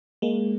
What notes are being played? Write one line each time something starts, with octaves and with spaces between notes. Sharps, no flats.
G#3 A#3